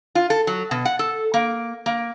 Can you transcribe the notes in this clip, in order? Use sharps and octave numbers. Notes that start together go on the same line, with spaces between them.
F4
A4
F#3
B2
F#5
A4
A#3
A#3